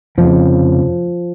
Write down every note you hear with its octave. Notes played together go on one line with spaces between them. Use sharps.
F1 F2 C#3 F3